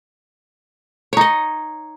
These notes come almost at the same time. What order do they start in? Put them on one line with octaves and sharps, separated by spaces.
C#5 D#4 D#5